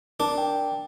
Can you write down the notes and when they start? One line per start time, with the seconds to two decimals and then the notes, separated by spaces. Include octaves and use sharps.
0.20 D4 A#4
0.38 G5